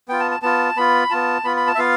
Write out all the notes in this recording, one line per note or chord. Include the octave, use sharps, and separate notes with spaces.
B3 F4 G5
A5
A5
B3 F4 A5
B3 F4 B5
B3 F4 A5
B3 F4 B5
B5
A5
E5
B3 F4 F5